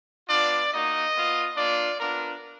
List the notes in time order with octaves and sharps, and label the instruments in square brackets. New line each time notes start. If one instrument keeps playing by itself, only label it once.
[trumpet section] B3 D4 F4 D5
A#3 D#4 F#4 D#5
B3 F4
A#3 D4 F4 D5
B3 D4 F4 A#4